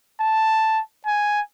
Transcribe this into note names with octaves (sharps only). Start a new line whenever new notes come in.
A5
G#5